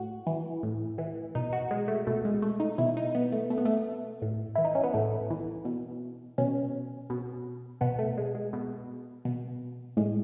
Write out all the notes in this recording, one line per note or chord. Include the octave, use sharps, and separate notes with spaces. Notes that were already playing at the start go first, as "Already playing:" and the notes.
Already playing: A2 F#4
E3
A2
E3
B2 D#4
F#4
G#3
A3
B2 A3
G#3
A3
D#4
B2 E4
D#4
B3
A3
B2 A3
B3
A3
A2
E3 E4
D#4
C#4
B3
A2 A3
E3
B2
B2 C#4
B2
B2 B3
A3
G#3
G#3
B2
B2
A2 G#3